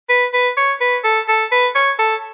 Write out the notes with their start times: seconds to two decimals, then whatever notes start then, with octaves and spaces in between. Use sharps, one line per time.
0.09 B4
0.33 B4
0.57 C#5
0.81 B4
1.04 A4
1.28 A4
1.52 B4
1.75 C#5
1.99 A4